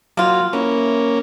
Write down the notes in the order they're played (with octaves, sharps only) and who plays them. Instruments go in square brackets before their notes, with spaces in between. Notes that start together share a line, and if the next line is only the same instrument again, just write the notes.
[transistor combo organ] F#3 [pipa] A#3 F4
[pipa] E3 [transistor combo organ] A#3 C#4